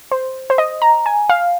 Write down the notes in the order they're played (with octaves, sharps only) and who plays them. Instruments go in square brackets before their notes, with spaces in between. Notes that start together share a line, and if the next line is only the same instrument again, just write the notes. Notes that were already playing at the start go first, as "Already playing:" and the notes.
[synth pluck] C5
C5
D#5
A#5
G#5
F5